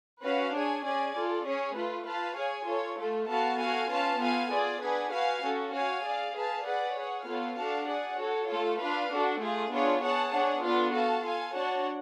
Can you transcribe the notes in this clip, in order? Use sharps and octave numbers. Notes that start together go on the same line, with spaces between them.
C#4 F#4 B4 F5
D4 G#4 C#5 G#5
C#4 G#4 D5 G#5
F4 A4 D5
C#4 G#4 C#5
A3 F4 B4
F4 B4 F5 A5
G#4 C#5 G#5
F4 A4 C#5
A3 F4 A4
B3 F#4 A4 F5 A5
F#4 A4 F5 G#5
C#4 F4 B4 F5 A5
B3 F4 A4 F5 G#5
F4 G#4 D5
D4 G#4 B4 F#5
F#4 B4 F5 G#5
C#4 F#4 A4
F#4 C#5 F5 G#5
G#4 D5 F5
G#4 B4 F5 A5
G#4 B4 D5 F#5
G#4 C#5 F#5
B3 F4 A4 C#5 F5
D4 F#4 A4 F5 A5
G#4 D5 F#5
F#4 A4 C#5
A3 F4 A4
D4 F4 B4 F5
D4 F#4 A4
A3 F4 G#4
B3 D4 F4 G#4 C#5
G#4 C#5 F#5 A5
D4 G#4 C#5 F#5
B3 D4 F4 A4
F#4 A4 F5 A5
F4 A4 F5 G#5
D4 F#4 C#5 F#5 A5